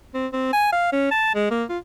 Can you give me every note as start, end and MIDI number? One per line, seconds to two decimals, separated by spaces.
0.14 0.27 60
0.33 0.51 60
0.53 0.68 80
0.72 0.91 77
0.92 1.09 61
1.11 1.31 81
1.35 1.48 56
1.51 1.64 58
1.69 1.78 65